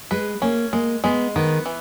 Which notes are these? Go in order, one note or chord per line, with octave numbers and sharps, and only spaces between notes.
G#3 B4
A#3 C#4
G#3 A#3
G#3 B3
D#3 B3
E3